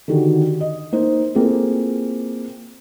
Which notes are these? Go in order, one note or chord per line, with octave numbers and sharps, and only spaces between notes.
D3 D#3 D#4 F#4 G4
D#5
A#3 D#4 C5
A#3 C4 E4 F4 G#4 A4